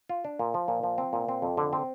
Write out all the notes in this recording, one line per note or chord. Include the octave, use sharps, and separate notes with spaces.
F4
D4
A#2
F3
A#2
F3
C4
A#2
C4
F2
D3
C4